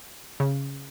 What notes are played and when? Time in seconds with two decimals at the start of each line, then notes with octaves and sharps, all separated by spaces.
0.40 C#3